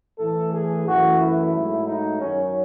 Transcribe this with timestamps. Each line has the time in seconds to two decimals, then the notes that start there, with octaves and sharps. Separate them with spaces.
0.19 A2 E3 A3 A4
0.53 G#4
0.86 F#2 E3 A3 F#4
1.20 E4
1.53 G#2 F#3 A3
1.87 D#4
2.20 F#2 D#3 F#3 C#4